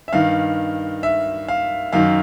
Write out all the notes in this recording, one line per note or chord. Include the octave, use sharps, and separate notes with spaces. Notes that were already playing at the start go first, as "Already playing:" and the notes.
E5
G2 D#3 F5
E5
F5
F#2 D#3 F5